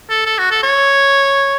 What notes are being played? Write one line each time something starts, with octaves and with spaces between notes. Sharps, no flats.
A4
A4
F#4
A4
C#5